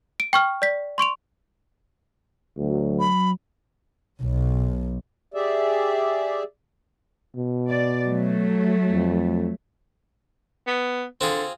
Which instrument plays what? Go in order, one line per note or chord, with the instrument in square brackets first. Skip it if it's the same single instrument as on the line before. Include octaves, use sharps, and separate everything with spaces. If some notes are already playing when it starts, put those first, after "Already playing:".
[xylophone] D7
G5 C#6 F6
D5 B6
C6 C#6 D7 F7
[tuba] D2 [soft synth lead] F#3
[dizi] B5
[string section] B1
[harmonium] G4 G#4 D5 E5
[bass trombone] B2
[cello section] D5
F#3 A3
[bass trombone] F2
[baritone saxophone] B3
[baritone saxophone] D3 [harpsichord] C4 F4 G#4